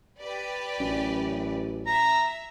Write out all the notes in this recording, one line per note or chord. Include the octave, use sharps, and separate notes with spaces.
G4 B4 D5
A1 F#2
E5 A#5